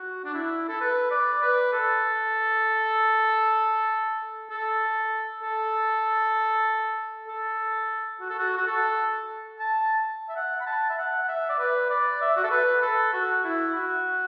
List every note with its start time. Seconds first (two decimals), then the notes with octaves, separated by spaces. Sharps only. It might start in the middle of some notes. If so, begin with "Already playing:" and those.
Already playing: F#4
0.24 D4
0.34 E4
0.68 A4
0.81 B4
1.11 D5
1.42 B4
1.73 A4
4.50 A4
5.43 A4
7.28 A4
8.20 F#4
8.30 A4
8.39 F#4
8.57 F#4
8.67 A4
9.59 A5
10.29 E5
10.36 F#5
10.60 B5
10.66 A5
10.89 E5
10.98 F#5
11.22 F#5
11.28 E5
11.49 D5
11.59 B4
11.90 D5
12.21 E5
12.36 F#4
12.44 A4
12.51 B4
12.82 A4
13.13 F#4
13.44 E4
13.75 F#4